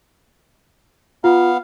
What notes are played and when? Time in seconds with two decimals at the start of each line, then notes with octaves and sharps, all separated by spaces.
1.24 B3 F4 F5